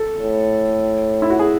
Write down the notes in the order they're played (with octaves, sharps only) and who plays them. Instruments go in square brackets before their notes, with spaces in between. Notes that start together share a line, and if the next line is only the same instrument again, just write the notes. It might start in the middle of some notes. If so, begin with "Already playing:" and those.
Already playing: [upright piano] A4
[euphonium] A2
[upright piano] E4
F#4
G#4